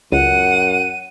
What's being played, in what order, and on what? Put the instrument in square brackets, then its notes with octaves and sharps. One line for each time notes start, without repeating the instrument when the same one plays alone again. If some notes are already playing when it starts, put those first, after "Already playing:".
[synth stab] C#2 [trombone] F#2 [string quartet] F#5 [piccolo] D#7